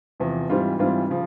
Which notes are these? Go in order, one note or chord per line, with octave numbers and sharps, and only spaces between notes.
E2 C3 F3
G#2 E3 G3 C4 F4
G#2 E3 G3 C4 F4
C#3 F3